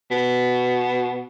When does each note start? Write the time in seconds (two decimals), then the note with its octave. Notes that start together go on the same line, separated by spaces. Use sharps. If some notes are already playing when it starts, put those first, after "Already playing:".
0.11 B2